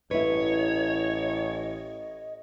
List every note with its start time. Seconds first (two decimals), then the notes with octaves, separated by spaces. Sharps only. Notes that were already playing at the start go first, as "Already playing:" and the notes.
0.11 A1 E4 B4 C#5 D#5